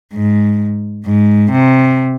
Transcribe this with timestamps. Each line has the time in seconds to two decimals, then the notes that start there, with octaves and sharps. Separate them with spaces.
0.13 G#2
1.05 G#2
1.51 C3